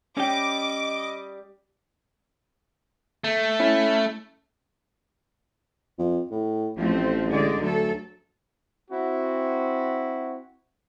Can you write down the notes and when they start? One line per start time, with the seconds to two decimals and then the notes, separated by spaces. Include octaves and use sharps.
0.17 G3 C#4 D#5 G5 D6
3.24 A3
3.60 C#4 E4
5.99 F2
6.31 A2
6.77 A1 F3 A3 C4
7.30 D3 G#3 D5
7.61 D2 F#3 A4
8.91 C4 E4 F#4